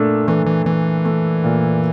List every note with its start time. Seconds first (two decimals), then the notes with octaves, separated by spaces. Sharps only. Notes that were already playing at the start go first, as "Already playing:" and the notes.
Already playing: A#2 A3 D4
0.28 E3 A3
0.46 E3
0.66 E3 A3
1.05 A3
1.44 A#2